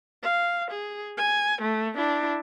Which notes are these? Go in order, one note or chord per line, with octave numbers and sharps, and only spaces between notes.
F5
G#4
G#5
A3
D4 E4